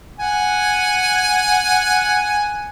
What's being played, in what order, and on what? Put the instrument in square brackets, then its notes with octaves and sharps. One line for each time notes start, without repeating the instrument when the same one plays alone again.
[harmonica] F#5 G#5